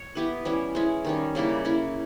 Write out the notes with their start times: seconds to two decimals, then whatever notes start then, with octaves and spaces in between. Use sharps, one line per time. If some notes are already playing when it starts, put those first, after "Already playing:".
Already playing: C#5
0.15 B3 E4 G4 B4
0.45 E3 G3 C#4 E4
0.75 G#3 C#4 E4
1.05 D#3 G3 C#4
1.35 C#3 G3 A#3 E4
1.65 A#3 C#4 E4